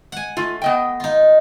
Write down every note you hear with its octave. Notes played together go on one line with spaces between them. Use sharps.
F#5 G#5
A3 F4
B3 D#5 G5
D#4 F4